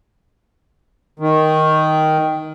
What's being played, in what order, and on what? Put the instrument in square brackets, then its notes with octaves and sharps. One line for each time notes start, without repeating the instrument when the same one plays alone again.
[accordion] D#3